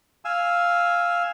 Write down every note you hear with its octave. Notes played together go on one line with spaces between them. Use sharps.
F5 G#5 E6